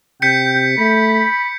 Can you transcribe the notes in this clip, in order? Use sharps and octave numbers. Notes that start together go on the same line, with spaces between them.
C3 G5 G6 B6 C#7
A3 B5